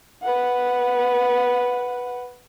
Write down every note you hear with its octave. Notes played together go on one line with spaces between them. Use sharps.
B4 F#5